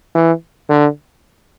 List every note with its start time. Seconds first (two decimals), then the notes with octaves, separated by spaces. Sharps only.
0.15 E3
0.70 D3